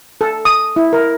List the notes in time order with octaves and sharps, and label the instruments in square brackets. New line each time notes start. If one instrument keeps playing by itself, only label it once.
[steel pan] A4
D#6
E4
A#4